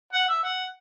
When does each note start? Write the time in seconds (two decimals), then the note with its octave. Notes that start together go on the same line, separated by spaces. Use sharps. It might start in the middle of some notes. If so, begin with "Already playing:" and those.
0.13 F#5
0.28 E5
0.43 F#5